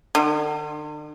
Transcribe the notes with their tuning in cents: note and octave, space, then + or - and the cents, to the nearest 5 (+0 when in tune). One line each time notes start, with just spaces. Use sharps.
D3 +45